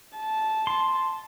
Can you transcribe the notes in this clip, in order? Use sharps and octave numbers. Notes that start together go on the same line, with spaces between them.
A5
C6